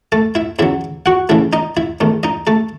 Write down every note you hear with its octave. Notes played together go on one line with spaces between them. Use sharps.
A3 A4
E4 E5
E2 C#3 F#3 E4 E5
F#4 F#5
C#3 E3 A3 E4 E5
D#4 D#5
E4 E5
E2 D#3 A3
D#4 D#5
A3 A4